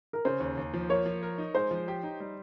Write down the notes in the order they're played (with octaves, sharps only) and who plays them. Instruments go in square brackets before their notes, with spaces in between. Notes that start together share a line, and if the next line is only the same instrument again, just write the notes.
[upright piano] A#4
[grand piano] C#3 [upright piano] C5
[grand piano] D#2
D#2
F3
[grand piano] A#3 [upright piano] C#5
[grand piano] F3
A#4
D#4
[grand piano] G#3 [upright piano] C5
[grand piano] F3
G4
D#4
G3